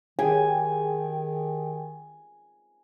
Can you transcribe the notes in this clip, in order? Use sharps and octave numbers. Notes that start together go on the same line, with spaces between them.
D#3 G4 G#4 G5 G#5